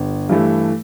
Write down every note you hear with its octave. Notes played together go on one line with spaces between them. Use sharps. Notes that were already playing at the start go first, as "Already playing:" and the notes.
Already playing: G1
G2 E3 A3